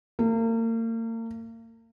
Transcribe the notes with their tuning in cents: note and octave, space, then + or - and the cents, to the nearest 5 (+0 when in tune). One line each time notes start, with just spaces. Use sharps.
A#3 -40